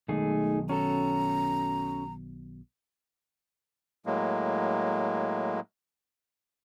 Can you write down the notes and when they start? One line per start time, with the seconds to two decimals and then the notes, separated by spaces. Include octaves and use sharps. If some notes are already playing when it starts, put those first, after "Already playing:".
0.08 B1 D#3 G#3 A3 D#4 G#4
0.69 C#4 F#4 A4 A#5
4.06 A2 F#3 G#3 A#3